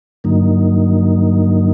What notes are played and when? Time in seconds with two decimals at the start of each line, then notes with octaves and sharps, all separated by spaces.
0.24 G2 D3 F#3 A#3 D#4